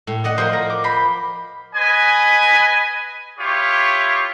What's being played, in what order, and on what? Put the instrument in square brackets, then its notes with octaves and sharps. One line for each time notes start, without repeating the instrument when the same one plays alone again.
[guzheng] A2
D5 D#5 F#5
[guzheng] F3 A#4 [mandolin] C5
[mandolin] A#5
D6
C5 B5
[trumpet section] B4 D#5 G#5
E4 F4 G4 C#5